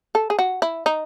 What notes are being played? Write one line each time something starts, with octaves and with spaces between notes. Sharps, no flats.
A4
G#4
F#4
E4
D#4